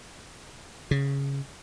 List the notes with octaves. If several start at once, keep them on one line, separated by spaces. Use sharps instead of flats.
C#3